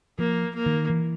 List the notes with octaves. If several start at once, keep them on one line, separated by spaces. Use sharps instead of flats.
F3 A#3
A#3
D#3
E3